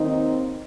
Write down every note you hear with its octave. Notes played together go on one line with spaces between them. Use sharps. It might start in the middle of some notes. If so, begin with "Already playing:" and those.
Already playing: D#2 D#3 C4 D#4